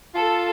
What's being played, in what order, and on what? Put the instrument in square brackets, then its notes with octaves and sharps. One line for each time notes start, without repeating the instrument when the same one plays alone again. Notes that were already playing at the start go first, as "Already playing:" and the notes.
[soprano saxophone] F4 [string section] A4